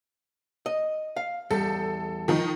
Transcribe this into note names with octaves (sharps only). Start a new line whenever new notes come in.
D#5
F5
E2 G3 A4
D#3 F3 D#4